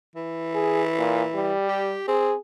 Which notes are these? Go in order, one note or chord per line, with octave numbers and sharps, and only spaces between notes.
E3
G#4
A#2
G3
G4
C4 G#4